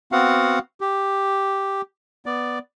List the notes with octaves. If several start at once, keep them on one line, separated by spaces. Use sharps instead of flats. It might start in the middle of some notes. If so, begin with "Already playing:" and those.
B3 C4 F#4 F5 F#5
G4
B3 D5